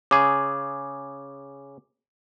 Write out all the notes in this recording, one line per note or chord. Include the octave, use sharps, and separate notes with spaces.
C#3 G#4 D6